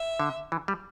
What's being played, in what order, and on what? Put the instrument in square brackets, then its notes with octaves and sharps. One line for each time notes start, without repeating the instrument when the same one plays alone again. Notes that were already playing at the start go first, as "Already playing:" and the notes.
Already playing: [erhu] E5
[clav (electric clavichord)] D3
E3
G3